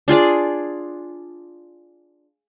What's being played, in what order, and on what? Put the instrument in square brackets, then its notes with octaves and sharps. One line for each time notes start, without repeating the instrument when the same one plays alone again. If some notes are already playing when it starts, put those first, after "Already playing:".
[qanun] D4 F4 G#4 D5